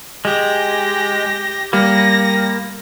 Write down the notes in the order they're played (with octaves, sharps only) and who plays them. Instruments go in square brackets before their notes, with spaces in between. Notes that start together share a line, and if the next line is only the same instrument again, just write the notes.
[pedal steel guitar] G#3 [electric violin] G4 A#6
[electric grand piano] G3 [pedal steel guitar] A#3 [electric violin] A#6